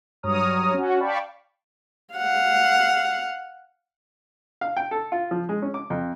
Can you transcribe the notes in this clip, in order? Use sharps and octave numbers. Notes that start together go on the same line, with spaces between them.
G2 F#3 C#5 A#5 D#6 F6
C#4 F#4
D5 F5 G5 A5 B5 C#6
F5 F#5
F5
G5
A4
F4
F3
G#3
C#4
D6
F2